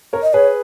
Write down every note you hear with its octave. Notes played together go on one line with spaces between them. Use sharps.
A#4 C#5
D#5
G#4 B4 C#5